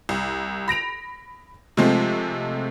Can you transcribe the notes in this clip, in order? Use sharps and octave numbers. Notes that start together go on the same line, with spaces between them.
C2
B5 A#6 D7 F7
C3 F3 G#3 A3 C4